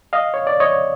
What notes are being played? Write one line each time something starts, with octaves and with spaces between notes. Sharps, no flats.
D#5 F5
C#5
D5
C#5 D#5